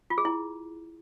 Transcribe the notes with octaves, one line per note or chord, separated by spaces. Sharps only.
F4
G#4
E4